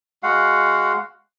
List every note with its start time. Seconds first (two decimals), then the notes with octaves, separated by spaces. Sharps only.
0.23 G#3 F#4 F5 F#5